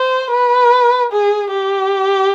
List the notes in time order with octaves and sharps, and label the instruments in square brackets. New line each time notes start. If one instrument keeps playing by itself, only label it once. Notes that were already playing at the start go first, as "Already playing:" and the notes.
Already playing: [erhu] C5
B4
G#4
G4